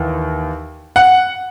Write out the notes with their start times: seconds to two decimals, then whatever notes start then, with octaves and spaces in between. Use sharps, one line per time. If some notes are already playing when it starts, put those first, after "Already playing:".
Already playing: D#2 E3
0.96 F#5